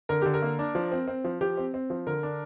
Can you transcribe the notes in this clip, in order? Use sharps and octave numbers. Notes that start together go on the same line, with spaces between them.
D3 A#4
D3 G4
A#4
A#3
D4
F3
C4
C4
F3
F3 G4
C4
C4
F3
D3 A#4
D4